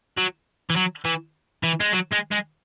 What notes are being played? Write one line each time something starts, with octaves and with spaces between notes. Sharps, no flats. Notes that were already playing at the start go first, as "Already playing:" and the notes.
F#3
E3
F#3
E3
E3
G#3
F#3
G#3
G#3